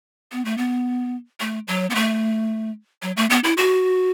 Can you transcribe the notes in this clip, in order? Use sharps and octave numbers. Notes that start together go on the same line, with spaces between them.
B3
A3
B3
A3
F#3
B3
A3
F#3
A3
B3
E4
F#4